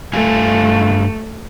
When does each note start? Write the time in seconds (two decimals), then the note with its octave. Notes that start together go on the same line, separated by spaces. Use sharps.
0.13 G2 A3 F4 G#5